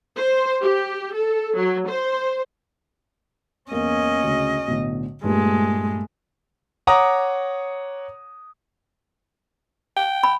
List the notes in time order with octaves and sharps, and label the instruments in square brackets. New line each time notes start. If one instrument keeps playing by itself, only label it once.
[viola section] C5
G4
A4
F#3
C5
[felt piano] E2 A#3 [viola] C#4 [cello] D#5
[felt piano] D2 C#3
B1 A2 D3
[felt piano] G2 A#2 [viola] G#3 [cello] A3
[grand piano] C#5 F#5 A#5 D6 D#6 A#6
[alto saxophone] G5
[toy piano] B5